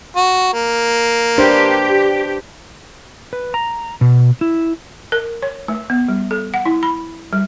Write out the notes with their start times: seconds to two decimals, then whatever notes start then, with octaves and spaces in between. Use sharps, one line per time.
0.16 F#4
0.53 A#3
1.38 D4 G4 B4 C5
3.33 B4
3.54 A#5
4.01 B2
4.41 E4
5.12 A#4
5.42 C#5
5.68 A3
5.90 B3
6.09 G3
6.31 A4
6.54 F#5
6.65 E4
6.83 B5
7.33 G3